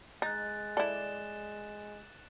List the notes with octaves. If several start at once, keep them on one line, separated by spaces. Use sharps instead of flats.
G#3 D#4 F#6 A6
E4 A4 D5 E7 G7